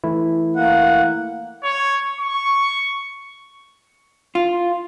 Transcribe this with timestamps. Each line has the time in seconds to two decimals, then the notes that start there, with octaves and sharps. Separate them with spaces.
0.04 E3 A3 E4
0.56 A#3 F#5
1.64 C#5
2.20 C#6
4.35 F4